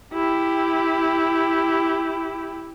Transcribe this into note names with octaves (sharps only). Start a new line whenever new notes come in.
E4 G4